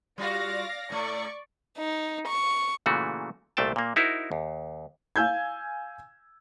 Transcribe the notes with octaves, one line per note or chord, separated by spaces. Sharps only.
G3 F4 F#4 D5 F5 A#6
A2 A3 D5 C#6
D#4
C#6
A#2 C#3 E3 A3 F#4
C2 A#2 A3 F4 G5 A5
A#2 A#3
D#4 E4 F#4 A#4 C5
D#2
F5 G#5 E6 G6 G#6